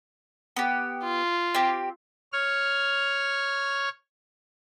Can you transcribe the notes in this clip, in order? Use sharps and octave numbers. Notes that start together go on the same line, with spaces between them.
B3 G4
F4
C4 G4
C#5 F6